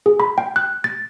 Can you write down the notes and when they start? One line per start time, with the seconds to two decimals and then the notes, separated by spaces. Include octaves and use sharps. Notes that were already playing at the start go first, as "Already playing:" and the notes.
0.06 G#4
0.20 B5
0.38 G5
0.56 F#6
0.84 A6